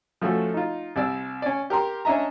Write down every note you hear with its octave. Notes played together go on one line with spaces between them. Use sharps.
F3 A3 C#4 F#4 A4
D#4 F4
C2 C3 D5 E6
C#4 D5
G4 A#4 A#5 C6
C#4 D4 D#5 E5 A#5